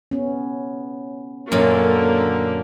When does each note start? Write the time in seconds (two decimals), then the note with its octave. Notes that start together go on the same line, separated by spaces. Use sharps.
0.11 B3 C#4
1.52 F#2 A#2 D3 A#3 C#4 C#5